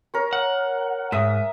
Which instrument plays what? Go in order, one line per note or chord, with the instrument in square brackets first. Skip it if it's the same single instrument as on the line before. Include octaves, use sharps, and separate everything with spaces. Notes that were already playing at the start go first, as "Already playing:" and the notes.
[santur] A#4 C#5
[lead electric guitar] F#5
[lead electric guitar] G#2 [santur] E5 D#6